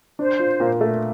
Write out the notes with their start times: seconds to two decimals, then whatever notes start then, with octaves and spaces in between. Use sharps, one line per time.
0.19 D4 C5
0.40 F4
0.60 A#2
0.81 A3